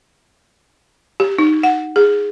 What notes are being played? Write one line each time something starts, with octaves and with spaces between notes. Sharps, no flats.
G4
D#4
F#5
G#4